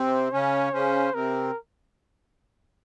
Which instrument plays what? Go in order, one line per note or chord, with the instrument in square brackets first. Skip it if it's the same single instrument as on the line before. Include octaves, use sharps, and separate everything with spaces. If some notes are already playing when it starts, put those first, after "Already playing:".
Already playing: [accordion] C3 C4 [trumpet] C5
[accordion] C#3 C#4 [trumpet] C#5
[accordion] C#3 C#4 [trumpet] C5
[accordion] C3 C4 [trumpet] A#4